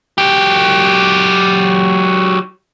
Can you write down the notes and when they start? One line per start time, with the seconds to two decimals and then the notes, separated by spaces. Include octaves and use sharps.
0.18 F#3 G4